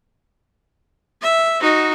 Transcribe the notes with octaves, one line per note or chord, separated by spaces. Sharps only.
E5
D#4 F#4